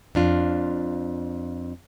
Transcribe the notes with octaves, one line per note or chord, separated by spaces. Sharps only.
F2 D4 F4